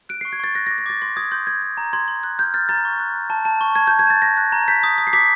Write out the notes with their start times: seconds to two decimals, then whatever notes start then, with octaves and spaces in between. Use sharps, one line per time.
0.09 F#6 D7
0.21 C#6 C7
0.33 G#6
0.40 C#6 A6
0.55 F#6 A#6
0.67 A#6
0.71 D6
0.78 A#6
0.86 D6 A6
1.02 C6 A#6
1.17 D#6 G#6
1.32 C6 G6
1.47 G6 G#6
1.62 G6
1.77 A#5
1.93 C6 G#6
2.08 C6
2.23 F#6
2.39 F6 G6
2.54 F6 A6
2.69 A#5 A6
2.85 C#6
3.00 F#6
3.14 A#5
3.30 A5
3.45 A5
3.61 C#6
3.75 A5 G#6
3.87 A5 G6
3.99 G#6
4.07 A5 A6
4.22 F#6 A#6
4.37 F#6
4.52 A#5
4.68 G6 B6
4.83 D#6
4.98 D#6
5.07 C7
5.13 D6 B6